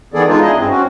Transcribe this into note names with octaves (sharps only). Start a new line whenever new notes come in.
D#3 E3 B3 G#4 A4 D5
G#3 D4 D#4 F4
D4 E4 G#4 D#5
G2 C4
C4 C#4 F#4